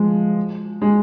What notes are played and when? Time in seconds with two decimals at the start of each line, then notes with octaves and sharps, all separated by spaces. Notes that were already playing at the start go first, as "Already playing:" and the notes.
Already playing: F3 G#3
0.82 G#3